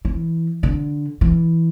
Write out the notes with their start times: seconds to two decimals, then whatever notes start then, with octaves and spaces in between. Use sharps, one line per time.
0.05 E3
0.63 D3
1.21 E3